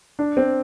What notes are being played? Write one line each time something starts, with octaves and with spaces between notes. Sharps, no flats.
D4
C4